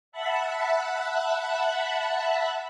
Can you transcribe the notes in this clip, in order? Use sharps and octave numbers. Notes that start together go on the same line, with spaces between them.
E5 F#5 A5 B5 F#6